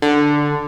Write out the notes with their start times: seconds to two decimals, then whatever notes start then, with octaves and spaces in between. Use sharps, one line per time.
0.02 D3